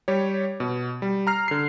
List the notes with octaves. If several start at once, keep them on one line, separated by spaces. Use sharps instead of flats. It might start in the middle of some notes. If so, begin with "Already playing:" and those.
G3 G4 C#5
B2
G3
A#5 F6 C7
D3 C7